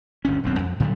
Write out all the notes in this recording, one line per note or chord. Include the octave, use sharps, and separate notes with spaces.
G1 D2 C#4
D#1 B1 F#2 C4
F2
A2 D3 F#3 G3